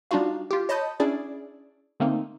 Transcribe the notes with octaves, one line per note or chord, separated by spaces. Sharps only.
G3 D4 D#4 F4 F#4 F5
F4 G4
C#5 D#5 A5 B5 D#6 G6
C#4 D4 E4 G#4 D5
D3 A3 A#3 C4 D#4